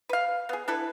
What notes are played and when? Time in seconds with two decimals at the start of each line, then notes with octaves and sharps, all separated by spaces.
0.09 B4 F5
0.49 B3 G#4
0.68 D4 E4 A4 B4